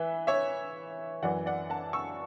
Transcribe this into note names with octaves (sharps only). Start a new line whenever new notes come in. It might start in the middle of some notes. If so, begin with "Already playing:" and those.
Already playing: E3 B4 E5
C#5 E5
F#2 E3 D5 F#5
D5 F#5
F#5 A5
C#6 E6